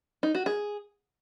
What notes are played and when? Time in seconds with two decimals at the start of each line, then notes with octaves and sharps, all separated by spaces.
0.23 D#4
0.35 F#4
0.46 G#4